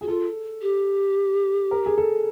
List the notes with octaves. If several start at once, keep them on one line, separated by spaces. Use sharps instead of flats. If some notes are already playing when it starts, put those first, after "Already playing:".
F#4 G#4
F4 A4
G4
A#4
G#4
A4